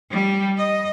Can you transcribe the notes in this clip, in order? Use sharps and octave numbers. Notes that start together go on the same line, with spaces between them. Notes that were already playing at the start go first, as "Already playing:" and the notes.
G3
D#5